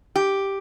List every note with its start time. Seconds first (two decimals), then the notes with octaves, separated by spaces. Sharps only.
0.16 G4